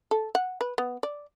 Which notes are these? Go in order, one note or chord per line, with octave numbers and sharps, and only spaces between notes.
A4
F#5
B4
B3
D5